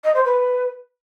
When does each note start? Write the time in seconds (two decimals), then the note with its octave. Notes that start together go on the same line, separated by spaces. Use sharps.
0.04 D#5
0.14 C5
0.25 B4